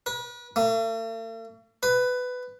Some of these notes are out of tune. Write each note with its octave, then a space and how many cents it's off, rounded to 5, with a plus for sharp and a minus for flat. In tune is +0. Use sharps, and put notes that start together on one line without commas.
B4 -35
A3 +45
B4 +15